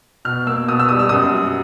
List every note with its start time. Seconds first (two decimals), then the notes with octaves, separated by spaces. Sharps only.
0.25 B2 F6
0.47 A#3 E6
0.68 B2 D#6
0.79 E6
0.89 G3 D#6
0.99 E6
1.09 F#2 D#6
1.34 F#3